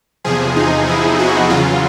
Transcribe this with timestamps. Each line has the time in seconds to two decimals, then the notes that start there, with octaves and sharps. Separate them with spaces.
0.24 E2 C3 F3 G#4
0.56 D#4
0.88 E4
1.19 F#4
1.49 E2 C#3 F#3 F4